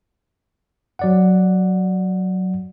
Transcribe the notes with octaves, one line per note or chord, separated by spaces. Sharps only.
F#3 D5 F#5